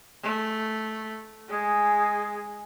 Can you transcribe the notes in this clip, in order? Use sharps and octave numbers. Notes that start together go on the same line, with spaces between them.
A3
G#3 G#4